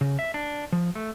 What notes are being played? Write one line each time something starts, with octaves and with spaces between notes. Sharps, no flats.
C#3
E5
D4
F3
A3